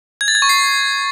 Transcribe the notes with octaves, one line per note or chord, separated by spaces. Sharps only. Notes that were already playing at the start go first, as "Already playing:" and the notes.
G#6
A6
G#6
C#6
C7